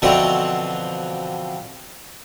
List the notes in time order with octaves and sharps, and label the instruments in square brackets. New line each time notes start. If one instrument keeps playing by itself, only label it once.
[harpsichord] B2 D3 E3 F3 C4 F#4